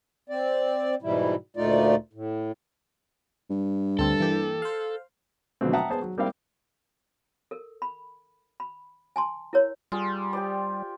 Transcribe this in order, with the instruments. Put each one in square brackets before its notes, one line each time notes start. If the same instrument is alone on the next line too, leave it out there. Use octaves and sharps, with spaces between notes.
[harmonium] C4 D5
G#2 B2 E3 G3 E4
D2 A#2 A3 D#4 F4 D5
A2
[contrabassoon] G2
[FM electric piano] D2 C4 [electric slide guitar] A4
[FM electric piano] E3 A#3 G4
C5 F5
[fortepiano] B2 D3 F3 F#3 A3 C4
E5 F#5 G5 A5 A#5 D#6
B3 G#4 C5 A5
F#3
G3 A#3 C4 E4 F5 G5
[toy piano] A4 A#4
B5
B5
G#5 A5 C6
E4 A#4 C#5
[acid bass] G3 [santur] F4 G#4 C6
[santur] G4 C5 D5